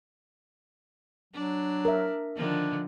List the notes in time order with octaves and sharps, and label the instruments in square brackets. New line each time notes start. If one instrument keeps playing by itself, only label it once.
[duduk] F#3 [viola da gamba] D4
[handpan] A#4 E5
[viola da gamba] D3 D#3 F3 [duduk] D4